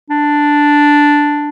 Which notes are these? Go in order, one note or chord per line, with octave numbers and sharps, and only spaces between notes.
D4